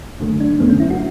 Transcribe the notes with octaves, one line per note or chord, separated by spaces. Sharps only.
F#2 D3 F#3 A3
D4
F#2 D3 F#3 A3 B3
C#4
E4
F#4